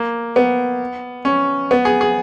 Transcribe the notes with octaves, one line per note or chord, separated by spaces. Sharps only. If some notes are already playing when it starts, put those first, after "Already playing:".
Already playing: A#3
B3
C#4
B3
G#4
G#4